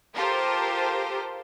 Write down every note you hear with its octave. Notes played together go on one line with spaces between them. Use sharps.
F4 G4 A4 A#4 C5